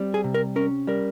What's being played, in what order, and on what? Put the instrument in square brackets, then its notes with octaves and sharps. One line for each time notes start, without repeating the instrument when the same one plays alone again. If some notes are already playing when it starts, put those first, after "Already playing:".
Already playing: [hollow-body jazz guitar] G3 C4
G#4
C3
A#4
C#4 A#4
G3 A#4